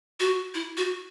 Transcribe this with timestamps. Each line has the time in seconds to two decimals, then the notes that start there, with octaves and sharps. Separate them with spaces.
0.20 F#4
0.54 E4
0.77 F#4